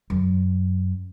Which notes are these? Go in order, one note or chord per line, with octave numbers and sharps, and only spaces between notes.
F#2